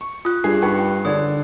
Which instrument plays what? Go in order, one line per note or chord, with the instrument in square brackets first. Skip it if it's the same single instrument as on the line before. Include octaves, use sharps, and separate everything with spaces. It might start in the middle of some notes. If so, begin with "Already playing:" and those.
[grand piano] C#6
[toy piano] F4 [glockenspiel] D#6 F#6
[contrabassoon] G2 [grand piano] G#4 [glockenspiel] C7
[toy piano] C#4 D#4 G5 [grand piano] B4 C#6
[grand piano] D3 [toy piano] G#4 C#5 D5 [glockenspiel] D#6